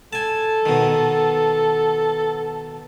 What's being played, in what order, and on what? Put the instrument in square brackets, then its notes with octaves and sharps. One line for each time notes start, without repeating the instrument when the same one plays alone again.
[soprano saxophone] A4 [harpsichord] G#5 A5
[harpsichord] B2 D#3